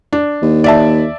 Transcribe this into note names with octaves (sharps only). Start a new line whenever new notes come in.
D4
D#2
D5 E5 A5